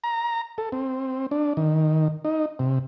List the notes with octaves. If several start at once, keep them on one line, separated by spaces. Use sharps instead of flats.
A#5
A4
C4
D4
D#3
D#4
C3